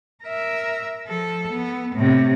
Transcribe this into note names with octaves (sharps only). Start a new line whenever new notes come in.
A#4 E5
F3 A4
B3
A2 C3